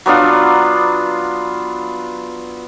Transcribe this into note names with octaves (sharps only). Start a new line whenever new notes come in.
F#3 B3 D4 F4